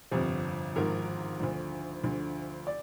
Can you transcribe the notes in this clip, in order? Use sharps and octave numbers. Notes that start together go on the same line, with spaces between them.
G1 F2 C3 F3
G#1 G#2 F3 A#4
D2 D3 F3
D2 D3 F3
D5